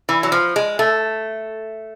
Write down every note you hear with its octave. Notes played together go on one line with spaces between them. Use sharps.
E3
F#3
F3
G#3
A3